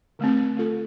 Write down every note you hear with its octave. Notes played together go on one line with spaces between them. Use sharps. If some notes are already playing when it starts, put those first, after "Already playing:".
D3 A3 C4
A3 F4 A4